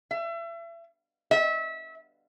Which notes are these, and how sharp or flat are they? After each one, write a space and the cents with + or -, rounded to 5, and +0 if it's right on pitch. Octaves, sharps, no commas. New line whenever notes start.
E5 +35
E5 -25